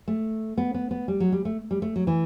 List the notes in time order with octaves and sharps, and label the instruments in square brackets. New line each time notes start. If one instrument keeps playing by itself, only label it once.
[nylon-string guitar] A3
B3
B3
B3
G3
F#3
G3
A3
G3
A3
F#3
E3